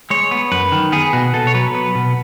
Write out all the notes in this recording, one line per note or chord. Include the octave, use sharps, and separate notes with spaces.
G#3 C#5
B3
F#2 B4
D#3
B3 G#4
B2 F#4
B2 A4
C#5
F#3 B4
B3
B2